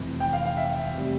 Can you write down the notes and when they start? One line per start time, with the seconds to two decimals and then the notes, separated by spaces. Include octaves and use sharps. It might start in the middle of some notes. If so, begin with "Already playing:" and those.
Already playing: F1 F2 E3
0.20 G5
0.33 F5
0.45 F5
0.57 E5
0.93 F1 C3 G3